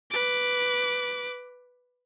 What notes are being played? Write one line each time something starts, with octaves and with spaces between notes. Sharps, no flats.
B4 D6